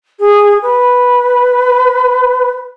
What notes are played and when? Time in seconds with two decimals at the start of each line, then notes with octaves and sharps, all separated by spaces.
0.20 G#4
0.62 B4